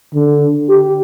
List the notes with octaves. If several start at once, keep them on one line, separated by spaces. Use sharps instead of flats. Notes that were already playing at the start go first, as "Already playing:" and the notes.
D3
G4